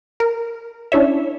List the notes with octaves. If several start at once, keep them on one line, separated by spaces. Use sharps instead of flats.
A#4
C#4 D4 E4 C#5 E5